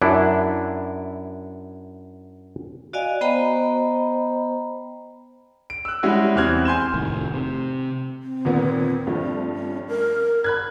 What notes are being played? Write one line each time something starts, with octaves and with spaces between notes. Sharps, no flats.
F#2 D4 E4
F#4 D5 D#5 F5 G#5
B3 C5 D#5 G5 A#5 B5
D7
E6 F#6
G3 G#3 C#4 E4 F#4
E2 E3 C4 F6 F#6 G#6
G#5 C6 G6 E7
F1 A2 D#3
C3
C4
D#2 A#2 B3
G2 F3 A3
C#4
A#4
B5 F#6 G#6